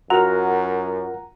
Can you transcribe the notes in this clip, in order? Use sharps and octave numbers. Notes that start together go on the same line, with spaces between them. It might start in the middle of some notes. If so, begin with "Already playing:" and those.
F#2 F4 F#4 A#4 F#5 A#5